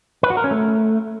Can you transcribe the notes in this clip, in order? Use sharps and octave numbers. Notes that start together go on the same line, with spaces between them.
B4
F#4
A#4
C#4
A3